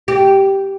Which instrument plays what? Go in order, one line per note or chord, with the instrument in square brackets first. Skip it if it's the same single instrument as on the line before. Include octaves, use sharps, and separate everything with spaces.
[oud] G4